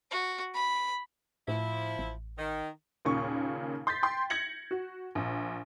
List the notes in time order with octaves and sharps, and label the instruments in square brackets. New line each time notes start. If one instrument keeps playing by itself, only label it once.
[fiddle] F#4
B5
[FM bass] A2 [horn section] F3 E4
[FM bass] A1
[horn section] D#3
[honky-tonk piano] D#2 A#2 C#3 C#6
C6 G6 A6 B6
G5 C6
G#6 A#6 C#7 F#7
F#4
A#1